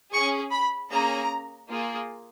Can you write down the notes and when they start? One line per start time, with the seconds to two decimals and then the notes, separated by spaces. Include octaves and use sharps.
0.12 C#4 G#4 C#6
0.51 B5
0.90 A#3 C#4 G#4 A#5
1.69 A#3 F4 G#4